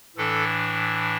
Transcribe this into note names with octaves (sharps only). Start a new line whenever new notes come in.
A2 E3 D4 A4